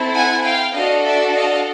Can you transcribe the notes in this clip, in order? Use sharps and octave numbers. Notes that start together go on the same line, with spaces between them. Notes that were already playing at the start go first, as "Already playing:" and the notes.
Already playing: C4 E4 A4
F#5 G#5
F5 G5
D4 F#4 A4 D#5 F5
D5 E5
D#5 F5